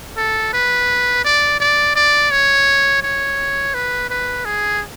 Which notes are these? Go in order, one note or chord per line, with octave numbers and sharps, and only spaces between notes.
A4
B4
D5
D5
D5
C#5
C#5
B4
B4
G#4